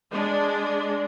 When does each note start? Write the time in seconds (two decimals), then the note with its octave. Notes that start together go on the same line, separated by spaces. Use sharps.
0.11 G#3 D4